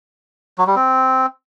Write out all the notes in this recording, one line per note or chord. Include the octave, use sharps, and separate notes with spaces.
F#3
G3
C4